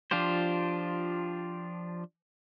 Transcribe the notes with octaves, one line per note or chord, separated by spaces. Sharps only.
F3 D4 F4 G4 C5